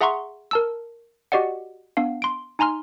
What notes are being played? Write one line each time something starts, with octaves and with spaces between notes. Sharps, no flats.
G#4 E5 F#5 A#5 C6 C#6
A#4 A5 E6
F#4 G4 D5 D#5 F#5
B3 D4 F5
C6 D7
D#4 G#5 A#5 C6 F6